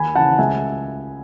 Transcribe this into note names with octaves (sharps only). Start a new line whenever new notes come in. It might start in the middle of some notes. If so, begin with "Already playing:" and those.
Already playing: D#2 G#5 B5
C#3 E3 F#5 A5
C#2 E5 G#5